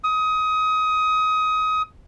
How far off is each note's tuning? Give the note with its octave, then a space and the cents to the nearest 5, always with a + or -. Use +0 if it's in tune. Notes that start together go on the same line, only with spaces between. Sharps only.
D#6 +20